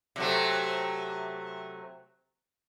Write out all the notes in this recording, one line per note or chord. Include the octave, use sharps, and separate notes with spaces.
C3 F#3 A3